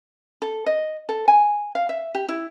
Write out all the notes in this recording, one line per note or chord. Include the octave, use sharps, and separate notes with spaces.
A4
D#5
A4
G#5
F5
E5
G4
E4